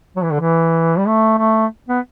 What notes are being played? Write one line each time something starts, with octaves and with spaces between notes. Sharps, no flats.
F#3
E3
D3
E3
G3
A3
A3
B3